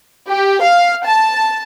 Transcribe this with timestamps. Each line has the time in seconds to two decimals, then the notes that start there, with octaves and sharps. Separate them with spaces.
0.30 G4
0.62 F5
1.06 A5